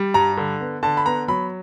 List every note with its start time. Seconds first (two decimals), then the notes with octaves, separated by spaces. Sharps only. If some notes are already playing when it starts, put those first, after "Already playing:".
Already playing: G3
0.14 G2 A#5
0.37 D3
0.60 B3
0.83 D3 A5
0.97 B5
1.05 B3 A#5
1.28 F#3 B5